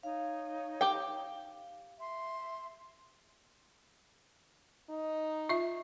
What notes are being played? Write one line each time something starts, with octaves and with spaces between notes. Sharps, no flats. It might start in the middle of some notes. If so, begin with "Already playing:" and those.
D#4 C#5 F5
G4 G5
E5 C6
D#4
F4 E5